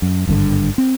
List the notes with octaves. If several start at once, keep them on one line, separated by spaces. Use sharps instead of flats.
F#2
G#1 G2 B2 D3
C4